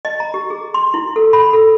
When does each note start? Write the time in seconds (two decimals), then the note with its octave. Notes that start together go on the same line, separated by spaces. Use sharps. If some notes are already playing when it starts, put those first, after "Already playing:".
0.05 D#5
0.20 A#5
0.34 G4
0.50 G#4
0.74 C6
0.94 E4
1.16 A4
1.33 B5
1.53 A4